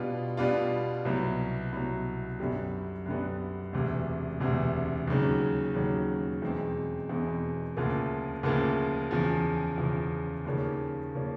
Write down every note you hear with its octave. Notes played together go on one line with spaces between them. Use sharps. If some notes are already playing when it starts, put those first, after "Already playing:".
Already playing: B2 G3 B3 D4 F4
B2 G3 B3 D4 F4
C2 B2 F#3
C2 B2 F#3
F#2 D3 G3 B3
F#2 D3 G3 B3
E1 D2 C3
E1 D2 C3
D#2 C#3 F#3
D#2 C#3 F#3
E2 B2 G#3 C4
E2 B2 G#3 C4
D2 C#3 F3 A#3
D2 C#3 F3 A#3
E2 C#3 F3
E2 C#3 F3
D#2 C#3 F3 A#3 C#4
C#3 F3 A#3 C#4